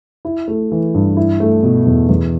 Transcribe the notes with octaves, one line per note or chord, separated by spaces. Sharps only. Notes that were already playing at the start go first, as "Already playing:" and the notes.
E4
A3
E3
G2
E4
A3
B2
E2
E2